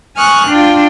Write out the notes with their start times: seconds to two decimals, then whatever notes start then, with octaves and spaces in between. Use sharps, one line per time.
0.17 G#5 C#6 D#6 F6 F#6
0.48 D4 F4 G5